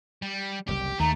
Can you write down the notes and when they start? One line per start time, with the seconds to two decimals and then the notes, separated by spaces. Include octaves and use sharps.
0.22 G3
0.68 F#1 C2 G3 G4
1.00 D#2 D#3 A3 A#5